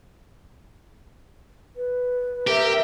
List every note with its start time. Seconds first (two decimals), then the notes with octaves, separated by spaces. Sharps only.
1.76 B4
2.47 G4 A#4 E5